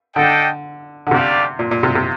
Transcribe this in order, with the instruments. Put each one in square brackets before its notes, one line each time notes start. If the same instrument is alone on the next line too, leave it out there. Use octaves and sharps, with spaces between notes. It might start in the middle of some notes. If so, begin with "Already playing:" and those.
[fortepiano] D3 [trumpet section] D4 A4 D#5 G5
[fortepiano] D3
[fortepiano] C3 [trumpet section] A3 D4 G4 D5 F5
[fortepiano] A#2
A#2
C3
C3